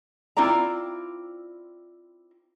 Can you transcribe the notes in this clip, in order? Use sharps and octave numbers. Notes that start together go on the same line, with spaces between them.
C4 E4 F4 D5 A#5